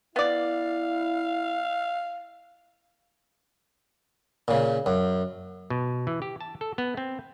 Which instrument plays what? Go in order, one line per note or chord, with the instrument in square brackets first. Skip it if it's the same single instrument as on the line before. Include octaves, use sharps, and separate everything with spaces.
[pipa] B3 D5 [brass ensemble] E4 [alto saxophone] F5
[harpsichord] A#2 C#3
F#2
[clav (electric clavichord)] B2
E3
G4
A5
A4
B3
C4